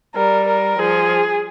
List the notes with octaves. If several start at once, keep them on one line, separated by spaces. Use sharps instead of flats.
G3 A#4
A#4
F3 G#4